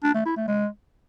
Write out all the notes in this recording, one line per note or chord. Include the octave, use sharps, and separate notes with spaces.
D4
A3
E4
A3
G#3